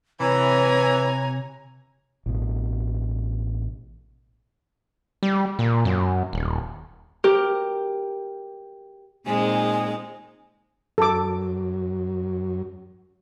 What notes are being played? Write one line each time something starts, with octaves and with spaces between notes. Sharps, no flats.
C3 E3 C#5 G#5 A#5
A1 B2
G3
A#2
F#2
D#1
G4 A#4
A#2 G#3 C4 D#4 G#4 G#5
F#2 A4 D6